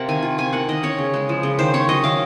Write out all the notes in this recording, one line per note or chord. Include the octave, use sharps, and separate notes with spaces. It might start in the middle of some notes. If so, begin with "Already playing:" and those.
Already playing: C3 A#3 C4 F#5
D#3 G#5
F4
C3 G#5
A#3 F#5
D#3 D#5
C#4 C#5
C#3
G#3
F3
C#3
D#3 C5
C#4 C#5
F#3 D#5
D#3 F5